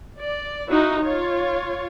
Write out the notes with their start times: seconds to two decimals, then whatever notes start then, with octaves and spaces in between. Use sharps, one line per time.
0.18 D5
0.69 D#4 E4 F#4
1.01 F4 C#5